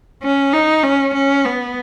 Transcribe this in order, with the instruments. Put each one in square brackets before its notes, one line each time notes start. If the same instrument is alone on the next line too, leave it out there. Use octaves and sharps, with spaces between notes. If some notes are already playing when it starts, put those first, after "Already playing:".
[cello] C#4
D#4
C#4
C#4
B3